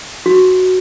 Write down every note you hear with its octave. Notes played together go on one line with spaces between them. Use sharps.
F#4